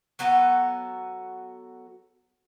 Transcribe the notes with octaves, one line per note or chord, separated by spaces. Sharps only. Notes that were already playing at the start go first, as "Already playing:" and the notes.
F#3 B3 F#4 A4